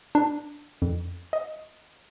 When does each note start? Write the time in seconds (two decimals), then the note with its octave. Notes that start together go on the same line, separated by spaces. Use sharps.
0.15 D4
0.82 F2
1.33 D#5